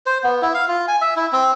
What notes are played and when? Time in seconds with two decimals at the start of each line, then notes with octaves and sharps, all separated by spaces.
0.06 C5
0.24 B3
0.42 E4
0.54 F5
0.68 F4
0.88 G#5
1.02 E5
1.16 E4
1.33 C4